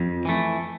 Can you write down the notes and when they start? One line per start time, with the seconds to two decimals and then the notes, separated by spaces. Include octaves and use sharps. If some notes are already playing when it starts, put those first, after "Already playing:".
Already playing: F2
0.25 E3 A3